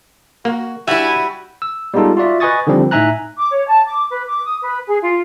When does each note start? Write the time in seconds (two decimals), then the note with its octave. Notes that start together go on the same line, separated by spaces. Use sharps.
0.45 A#3 F#4
0.88 G3 E4 F#4 E5 G#5
1.62 E6
1.94 G3 G#3 B3 D#4 F4 A4
2.17 F4 F#4 D5 E5
2.40 B4 D#5 G#5 C#6 D#6 A6
2.67 D3 D#3 F3 G3 C4
2.91 A2 D#4 E5 G#5 A#5 F#6
3.36 D6
3.52 C#5
3.67 A5
3.85 D6
4.11 B4
4.28 D6
4.44 D#6
4.62 B4
4.88 G#4
5.01 F4